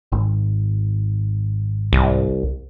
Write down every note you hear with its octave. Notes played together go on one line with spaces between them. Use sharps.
G#1
C2